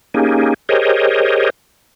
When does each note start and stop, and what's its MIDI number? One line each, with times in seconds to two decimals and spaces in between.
0.14 0.54 58
0.14 0.54 61
0.14 0.54 63
0.14 0.54 67
0.14 0.54 68
0.69 1.50 67
0.69 1.50 68
0.69 1.50 70
0.69 1.50 72
0.69 1.50 73
0.69 1.50 75